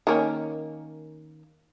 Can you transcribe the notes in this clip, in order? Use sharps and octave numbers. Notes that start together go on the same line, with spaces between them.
D#3 A#3 C#4